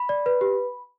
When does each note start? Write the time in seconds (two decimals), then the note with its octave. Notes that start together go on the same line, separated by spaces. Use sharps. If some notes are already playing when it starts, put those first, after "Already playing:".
Already playing: B5
0.09 D5
0.26 B4
0.41 G4